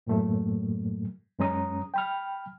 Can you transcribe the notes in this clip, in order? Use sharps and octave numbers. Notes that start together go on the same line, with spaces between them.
F#2 A2 F#3 A3 A#3
F#2 G#3 C#4 A#5 D#6
G5 B5 F6